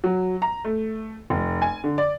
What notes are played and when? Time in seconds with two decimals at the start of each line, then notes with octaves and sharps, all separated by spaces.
0.04 F#3
0.42 A#5
0.65 A3
1.30 F1
1.62 G#5
1.84 D3
1.98 D5